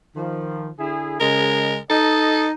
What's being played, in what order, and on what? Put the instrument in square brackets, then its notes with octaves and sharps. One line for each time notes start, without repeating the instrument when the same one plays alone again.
[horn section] D#3 F3
D3 E4 G#4
[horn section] C#3 G#3 [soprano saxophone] A#4
[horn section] D#4 D#5 [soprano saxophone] A4